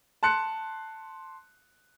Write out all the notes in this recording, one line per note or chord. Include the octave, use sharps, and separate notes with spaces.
A5 C6 F#6 C#7